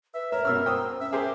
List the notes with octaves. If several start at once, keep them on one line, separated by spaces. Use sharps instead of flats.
B4 E5
A#4 C#5 E5
B2 C#4 E6 F6
C5 G5 D#6 E6
C#4 E5
G4 G#4 A#4 C5